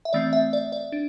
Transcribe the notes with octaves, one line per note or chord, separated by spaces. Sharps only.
E5
E3 A3 C4 D5
E5
D5
D5
D4